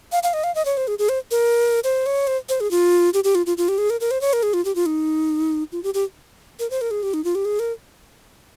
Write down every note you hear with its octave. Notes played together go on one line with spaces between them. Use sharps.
F5
F5
D#5
F5
D#5
C#5
C5
G#4
G#4
C5
A#4
C5
C#5
C5
C5
G#4
F4
G4
G4
F4
F4
F4
G4
G#4
A#4
A#4
C5
C#5
A#4
G#4
F4
G4
F4
D#4
F4
G4
G4
A#4
C5
A#4
G#4
G4
D#4
F4
G4
G#4
A#4